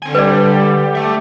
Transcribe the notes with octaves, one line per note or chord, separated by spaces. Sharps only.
D3 C4 G#5
G3 G4 B4 D5
A3 A4 E5